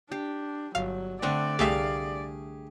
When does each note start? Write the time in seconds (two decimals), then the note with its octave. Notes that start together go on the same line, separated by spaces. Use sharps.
0.12 D4 G4
0.75 G1 F#3 F5
1.23 D3 A3 C4 D4 D5
1.59 C2 A3 G4 G#4 E5 F5